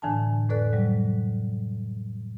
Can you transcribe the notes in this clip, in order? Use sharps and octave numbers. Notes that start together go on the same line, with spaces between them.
A2 D3 E3 D4 G#5 A5
F2 A2 A4 B4 D5 F#6
C3 F#3 G3